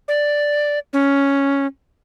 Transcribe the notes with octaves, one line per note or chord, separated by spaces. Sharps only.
D5
C#4